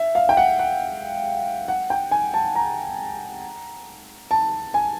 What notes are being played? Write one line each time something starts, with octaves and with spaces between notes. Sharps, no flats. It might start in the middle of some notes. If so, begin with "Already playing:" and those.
Already playing: E5
F5
G5
F#5
F#5
F#5
G5
G#5
A5
A#5
A5
G#5